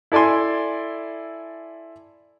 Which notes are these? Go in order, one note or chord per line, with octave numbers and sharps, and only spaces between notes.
E4 A4 D5 G#5 C6